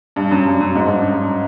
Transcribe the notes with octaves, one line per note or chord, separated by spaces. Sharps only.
G2
F#2
G2
F#2
G#2
G2
F#2
G2